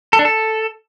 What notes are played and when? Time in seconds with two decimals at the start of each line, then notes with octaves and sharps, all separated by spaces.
0.13 A4
0.19 D4
0.25 A4